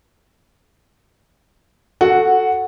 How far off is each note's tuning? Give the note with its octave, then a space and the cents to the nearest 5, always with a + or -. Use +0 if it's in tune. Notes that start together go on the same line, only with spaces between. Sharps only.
F#4 -10 A4 +0 F#5 +0